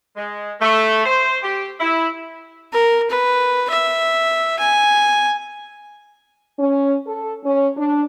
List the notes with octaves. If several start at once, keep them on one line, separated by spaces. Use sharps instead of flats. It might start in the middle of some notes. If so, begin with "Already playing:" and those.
G#3
A3
C5
G4
E4
A#4
B4
E5
G#5
C#4
A4
C#4
D4